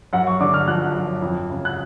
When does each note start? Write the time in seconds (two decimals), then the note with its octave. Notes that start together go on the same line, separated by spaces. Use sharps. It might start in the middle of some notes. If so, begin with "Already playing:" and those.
0.13 F#2 F#5
0.27 C#6
0.40 D3 D6
0.54 F6
0.68 F3 F#6
0.95 F#2
1.22 F2
1.50 C#3
1.65 F#6